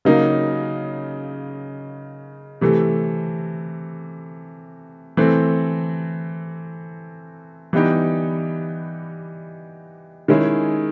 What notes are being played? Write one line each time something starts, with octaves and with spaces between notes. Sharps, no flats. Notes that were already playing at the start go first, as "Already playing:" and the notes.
C#3 F#3 A#3 D#4
C3 E3 A3
E3 A3 C4
E3 G3 B3 D#4 G4
D#3 G#3 C#4 E4 G#4